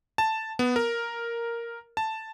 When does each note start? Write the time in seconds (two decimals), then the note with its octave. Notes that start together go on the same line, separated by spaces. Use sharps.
0.18 A5
0.59 B3
0.76 A#4
1.97 A5